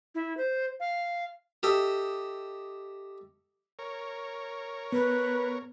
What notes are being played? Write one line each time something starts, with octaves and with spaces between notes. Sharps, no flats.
E4
C5
F5
G4 A4 D#5 E5
A#4 C#5
B3 B4